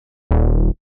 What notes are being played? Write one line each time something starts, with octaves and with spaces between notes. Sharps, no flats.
D#1